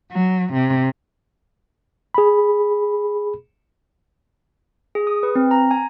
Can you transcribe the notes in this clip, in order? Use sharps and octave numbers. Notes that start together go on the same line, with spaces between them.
F#3
C3
G#4 B5
G#4
D#6
B4
C4
A#5
G#5